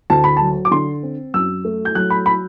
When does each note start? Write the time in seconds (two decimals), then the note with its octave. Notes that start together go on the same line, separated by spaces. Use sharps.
0.10 D2 A5
0.24 B5
0.37 F#3 A5
0.65 D6
0.71 D3 C6
1.03 C4
1.34 F#2 E6
1.65 A3
1.85 G6
1.95 F#3 F#6
2.10 B5
2.26 B5